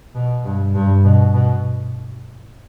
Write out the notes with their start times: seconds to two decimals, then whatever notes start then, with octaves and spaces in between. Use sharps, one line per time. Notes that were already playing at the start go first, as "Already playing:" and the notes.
0.15 B2
0.44 G2
0.75 G2
1.04 B2
1.33 B2